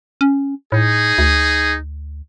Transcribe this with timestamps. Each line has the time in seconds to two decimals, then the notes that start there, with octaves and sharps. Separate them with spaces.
0.21 C#4
0.72 A2 D#4 G#4
1.18 D2